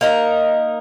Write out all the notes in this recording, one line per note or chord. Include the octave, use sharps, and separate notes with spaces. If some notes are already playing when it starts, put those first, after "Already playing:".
A#3 D#4 A#4